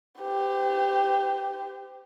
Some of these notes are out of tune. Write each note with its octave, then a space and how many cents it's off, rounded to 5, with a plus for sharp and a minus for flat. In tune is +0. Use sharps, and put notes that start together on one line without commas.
G4 +5 C5 -40